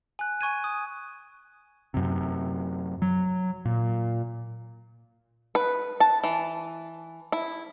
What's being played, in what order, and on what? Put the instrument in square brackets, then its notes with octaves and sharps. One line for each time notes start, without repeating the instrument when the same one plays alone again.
[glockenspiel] G#5 F#6
G#5 C#6 G#6 D#7
D#6
[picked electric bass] F#2 C3
F#3
A#2
[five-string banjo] B4
A5
E3
E4